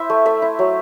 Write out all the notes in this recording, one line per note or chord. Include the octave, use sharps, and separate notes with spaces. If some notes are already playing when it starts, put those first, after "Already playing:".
Already playing: E4 C5 E5
A3
A3 E5
E4
F#3